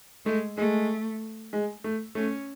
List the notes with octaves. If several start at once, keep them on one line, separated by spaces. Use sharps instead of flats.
G#3 A3
G#3 A3
G#3
A3
A3 C#4